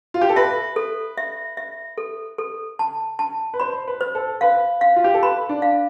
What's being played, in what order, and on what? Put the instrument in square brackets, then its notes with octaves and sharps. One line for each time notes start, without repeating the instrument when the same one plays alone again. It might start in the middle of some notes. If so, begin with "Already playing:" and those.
[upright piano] F4
G4
A4
[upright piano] B4 [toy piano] E5
[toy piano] A4
E5
E5
A4
A4
A5
A5
[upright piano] B4
[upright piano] C5 [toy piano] B5
[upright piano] B4
[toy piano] C5
[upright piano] A4
[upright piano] B4 [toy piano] F5
[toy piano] F5
[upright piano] F4
G4
A4
[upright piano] B4 [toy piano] B5
[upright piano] D4
[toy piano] F5